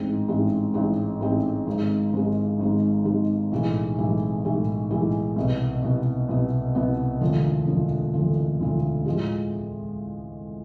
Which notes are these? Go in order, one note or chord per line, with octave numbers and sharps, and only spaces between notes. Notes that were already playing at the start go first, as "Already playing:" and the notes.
Already playing: A1 G#2 G#3 C4
A1 G#2 G#3 C4
A1 G#2 G#3 C4
A1 G#2 G#3 C4
G#1 G#2 G#3
G#1 G#2 G#3
G#1 G#2 G#3
G#1 G#2 G#3
B1 A2 E3 G#3
B1 A2 E3 G#3
B1 A2 E3 G#3
B1 A2 E3 G#3
C2 B2 B3
C2 B2 B3
C2 B2 B3
C2 B2 B3
E1 D2 D3 F3
E1 D2 D3 F3
E1 D2 D3 F3
E1 D2 D3 F3
A2 F3 G#3